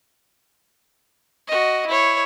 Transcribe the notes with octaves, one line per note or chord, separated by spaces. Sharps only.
F#4 D#5
E4 C#5